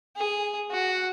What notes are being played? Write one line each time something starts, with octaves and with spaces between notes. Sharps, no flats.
G#4
F#4